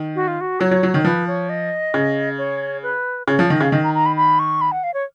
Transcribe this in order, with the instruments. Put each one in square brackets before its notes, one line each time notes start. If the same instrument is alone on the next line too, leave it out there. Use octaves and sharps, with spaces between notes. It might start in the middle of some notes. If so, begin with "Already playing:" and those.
Already playing: [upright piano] D#3
[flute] F#4
F4
F#4
[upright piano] F#3 [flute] C#5
[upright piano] F#3
F#3
D#3
[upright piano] F3 [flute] B4
[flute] C#5
D#5
[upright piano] C#3
[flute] C#5
B4
[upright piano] C#3 [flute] C#5
[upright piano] F3
[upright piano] D#3 [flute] D#5
[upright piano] C#3 [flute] F5
[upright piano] D#3 [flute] D#5
[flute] A#5
A#5
B5
B5
C#6
B5
F#5
F5
C#5